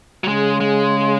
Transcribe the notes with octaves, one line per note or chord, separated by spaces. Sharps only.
F#3
C#3 G#3
G#3